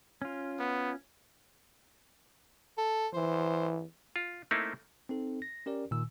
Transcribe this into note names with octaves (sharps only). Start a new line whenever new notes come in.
C#4 F4
B3
A4
E3 C5
F4
A3 A#3 C4 D#4 E4
C4 D#4 A4
A#6
C#4 G4 A#4 D5
A#2 D#3 E6